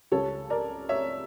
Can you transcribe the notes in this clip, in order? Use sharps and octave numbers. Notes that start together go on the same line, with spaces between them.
C#2 C#3 G3 A4 C#5
A#4 D5
C#5 E5